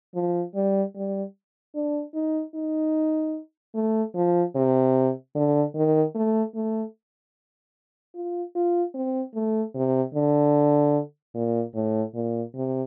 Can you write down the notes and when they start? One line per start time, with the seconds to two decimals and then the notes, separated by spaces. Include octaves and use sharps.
0.15 F3
0.55 G3
0.95 G3
1.75 D4
2.15 D#4
2.55 D#4
3.75 A3
4.15 F3
4.55 C3
5.35 D3
5.75 D#3
6.15 A3
6.55 A3
8.15 F4
8.55 F4
8.94 C4
9.35 A3
9.75 C3
10.15 D3
11.35 A#2
11.74 A2
12.14 A#2
12.55 C3